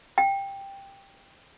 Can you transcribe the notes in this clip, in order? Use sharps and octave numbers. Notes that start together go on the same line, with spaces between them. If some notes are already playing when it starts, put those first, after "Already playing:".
G5